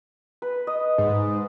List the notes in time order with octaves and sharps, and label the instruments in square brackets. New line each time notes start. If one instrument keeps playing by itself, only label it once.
[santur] B4
D#5
[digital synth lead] G#2